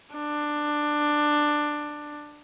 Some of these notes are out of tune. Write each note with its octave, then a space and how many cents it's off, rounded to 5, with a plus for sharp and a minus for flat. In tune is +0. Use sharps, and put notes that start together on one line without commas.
D4 +15